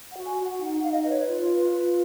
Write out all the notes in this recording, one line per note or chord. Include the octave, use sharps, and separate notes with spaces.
F#5
F#4
G#5
F#4
F#5
D#4 F#5
F#5
D#4 F5
D#5
B4 D#5
C#5
F4
B4
F4